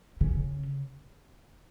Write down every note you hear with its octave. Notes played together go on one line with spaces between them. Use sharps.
C#3